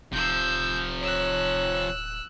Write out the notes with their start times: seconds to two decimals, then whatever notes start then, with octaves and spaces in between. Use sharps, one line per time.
0.12 D1 C3 F3 E6 G6
1.03 C#5 E6 F#6